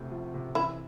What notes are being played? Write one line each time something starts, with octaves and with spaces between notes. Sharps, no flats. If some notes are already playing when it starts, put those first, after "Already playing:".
Already playing: D2 A2 C3
F3
C3
E3 E4